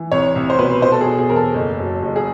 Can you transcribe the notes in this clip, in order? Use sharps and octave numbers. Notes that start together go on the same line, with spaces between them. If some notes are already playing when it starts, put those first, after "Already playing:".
Already playing: E3
C2 C#5
C2
C5
B2 B4
B2 C5
A4
G#4
B2
G#4
E1 A#4
A4
F#1
F#2
F#1
G#4